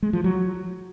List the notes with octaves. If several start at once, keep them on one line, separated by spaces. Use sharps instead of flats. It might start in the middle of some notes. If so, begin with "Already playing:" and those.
G#3
F3
F#3